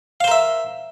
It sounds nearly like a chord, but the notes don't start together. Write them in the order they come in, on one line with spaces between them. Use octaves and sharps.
F5 C5 A#4 E5